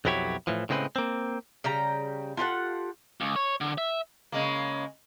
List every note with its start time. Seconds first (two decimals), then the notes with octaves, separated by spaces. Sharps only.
0.05 B1 F2 F#3 E4 G4 C#5
0.47 A2 E3 F3
0.69 A2 C#3 G#3 C4 B4
0.96 A#3 C4
1.64 C#3 G3 G5 A#5
2.37 F4 G4 A4 F#5
3.21 C#2
3.36 C#5
3.61 D3
3.78 E5
4.32 C#3 G#3 A#3